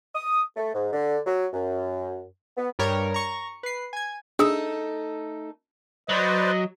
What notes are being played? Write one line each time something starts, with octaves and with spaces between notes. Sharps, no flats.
D#6
A3
G#2
D3
F#3
F#2
B3
G2 G3 A#4 C#5
A#5 C#6
B4 C7
G#5 G#6
A3 D4 D#4 G#4 A4 E6
F#3 B4 C5 D5 D#5